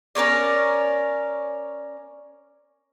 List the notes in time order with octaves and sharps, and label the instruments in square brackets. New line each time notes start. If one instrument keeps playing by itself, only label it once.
[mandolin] C#4 A#4 C#5 D5